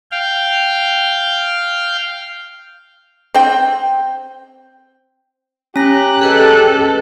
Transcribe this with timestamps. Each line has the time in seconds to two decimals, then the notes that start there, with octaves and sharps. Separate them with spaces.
0.11 F5 G5
3.34 C4 G5
5.76 C#4 G4 A#5 F#6 A#6
6.21 G#4 A4 B4 D#5